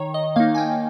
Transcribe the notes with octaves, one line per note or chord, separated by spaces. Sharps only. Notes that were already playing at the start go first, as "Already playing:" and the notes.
Already playing: D#3 C#5
D#5
A#3 D#4 F5
G#5
G5